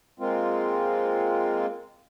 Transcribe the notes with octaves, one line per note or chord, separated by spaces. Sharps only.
G#3 A#3 C4 F4